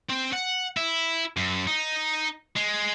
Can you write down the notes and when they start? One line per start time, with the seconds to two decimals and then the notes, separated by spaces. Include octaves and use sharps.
0.10 C4
0.33 F#5
0.77 E4
1.37 F#2
1.67 D#4
2.56 G#3